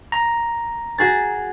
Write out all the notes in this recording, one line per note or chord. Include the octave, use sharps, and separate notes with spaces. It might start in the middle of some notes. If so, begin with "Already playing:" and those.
A#5
F#4 G#4 A6